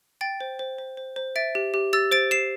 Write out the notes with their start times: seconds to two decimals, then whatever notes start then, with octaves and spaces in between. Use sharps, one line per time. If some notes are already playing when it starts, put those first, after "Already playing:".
0.21 G5 A6 D7
0.41 C5
0.59 C5
0.78 C5
0.97 C5
1.16 C5
1.36 E5 A6 D7
1.55 G4
1.74 G4
1.93 G4 E6 A6
2.12 C5 A6 D7
2.31 G4 C7 E7